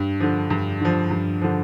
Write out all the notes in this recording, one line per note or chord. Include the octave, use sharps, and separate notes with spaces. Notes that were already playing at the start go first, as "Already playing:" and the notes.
Already playing: G2
D3 F3
G2
D3 F3
G2
D3 F3